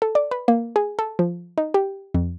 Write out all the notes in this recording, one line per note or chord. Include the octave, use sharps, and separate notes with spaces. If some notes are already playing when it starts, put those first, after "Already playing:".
A4
D5
B4
A#3
G#4
A4
F3
D#4
G4
F2